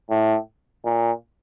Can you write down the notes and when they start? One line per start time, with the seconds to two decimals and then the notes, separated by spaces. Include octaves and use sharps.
0.10 A2
0.85 A#2